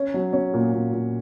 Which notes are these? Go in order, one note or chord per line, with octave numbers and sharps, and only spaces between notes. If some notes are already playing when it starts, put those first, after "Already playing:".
Already playing: C#4
F#3
C#4
A#2
A#2
A#2